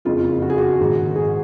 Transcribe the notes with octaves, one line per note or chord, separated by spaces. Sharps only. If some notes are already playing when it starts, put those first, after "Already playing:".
F#1 F2 C#3 G#3 F4
F#4
G#4
F#4
A#1 G#2 D#3
G#4